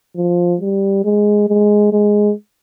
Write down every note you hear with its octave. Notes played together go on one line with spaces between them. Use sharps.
F3
G3
G#3
G#3
G#3